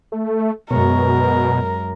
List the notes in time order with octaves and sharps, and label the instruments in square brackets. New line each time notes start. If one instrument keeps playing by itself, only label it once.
[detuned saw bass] A3
[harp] F#2 G#3 C#5 [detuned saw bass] B2 [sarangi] A#4